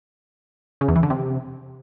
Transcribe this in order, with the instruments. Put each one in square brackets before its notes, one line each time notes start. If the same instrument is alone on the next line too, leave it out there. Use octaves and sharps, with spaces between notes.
[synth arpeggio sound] C#3
E2
E3
D3
C3